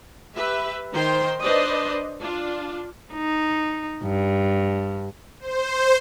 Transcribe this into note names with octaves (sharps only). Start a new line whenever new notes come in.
G4 B4 E5
D#3 C5 G5 A#5 C6
D4 B4 C5 D5 D#5
D4 F4
D#4
G2
C5